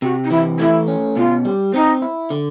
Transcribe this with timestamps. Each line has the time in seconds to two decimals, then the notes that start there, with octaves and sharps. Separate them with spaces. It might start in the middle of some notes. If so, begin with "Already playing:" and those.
0.02 C3 F#4
0.24 D#4
0.31 E3 E4
0.59 A3 E4
0.88 C#4
1.16 B2 F4
1.45 G3
1.74 C4 D#4
2.02 E4
2.30 D3